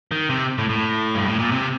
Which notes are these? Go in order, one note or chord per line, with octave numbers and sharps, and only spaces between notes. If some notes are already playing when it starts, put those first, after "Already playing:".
D#3
C3
A2
A2
G2
A2
A#2
C3